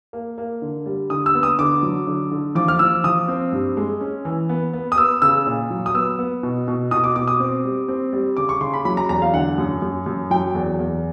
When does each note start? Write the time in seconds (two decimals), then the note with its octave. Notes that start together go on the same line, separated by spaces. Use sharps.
0.13 A#3
0.38 A#3
0.62 D3
0.86 G3
1.10 D3 D#6
1.26 E6
1.35 B3
1.43 D#6
1.59 D3 D6
1.83 F#3
2.07 D3
2.31 D3
2.55 F3 D6
2.68 F6
2.79 F3 E6
3.04 F3 D#6
3.28 C4
3.52 G2
3.77 G#3
4.01 C#4
4.25 E3
4.49 B3
4.73 B3
4.92 D#6
4.98 B3 E6
5.22 C#3 E6
5.46 A#2
5.70 F#3
5.86 D#6
5.94 B3 E6
6.19 B3
6.43 B2
6.68 B2
6.91 B2 D#6
7.04 D6
7.16 B2 D6
7.28 D#6
7.40 C4
7.64 G3
7.88 C4
8.13 G3
8.37 C#3 D6
8.49 C#6
8.61 C#3 C6
8.74 B5
8.85 F#3 B5
8.97 A#5
9.09 E2 A#5
9.22 F5
9.33 D3 F#5
9.58 F#2
9.82 F#2
10.06 F#2
10.31 F#3 G5
10.55 E2
10.79 E2